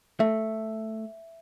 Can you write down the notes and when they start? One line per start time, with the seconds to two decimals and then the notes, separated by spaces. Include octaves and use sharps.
0.20 A3 E5